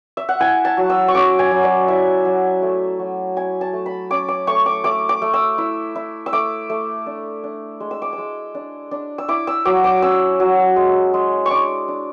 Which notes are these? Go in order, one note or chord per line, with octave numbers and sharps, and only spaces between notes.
E5
F#5
E4 G#5
A5
F#3
E6
C#6
C#4 D6
G#5
F#3
D5
E4 E5
F#3
A3
F#3
E4 G#5
A5
A3
B5
C#4 D6
D6
A3 C#6
D6
A3 D6
D6
A3
E6
E4
E4
E6
A3 D6
A3
D4
D4
G#3
E6
D6
E6
G#3
D4
D4
E6
E4 D6
E6
F#3 D6
D6
C#4 E6
F#3
G#3
G#3
C#6
D4 D6
D4